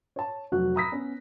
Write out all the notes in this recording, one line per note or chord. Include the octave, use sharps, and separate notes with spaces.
C#5 A5
F1 F#3 F#4 F#6
A#5 B5 D#6 E6 A#6 B6
B3 C#4 B4